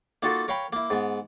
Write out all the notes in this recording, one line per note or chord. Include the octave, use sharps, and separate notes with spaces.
A#3 D#4 F4 F#4 A4 A#4
A#4 C#5 F5 G5 B5
A#3 E4
G#2 B3